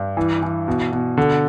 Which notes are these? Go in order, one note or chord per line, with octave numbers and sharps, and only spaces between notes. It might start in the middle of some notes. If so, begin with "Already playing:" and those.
Already playing: G2
E3
E3
B2
B2
D3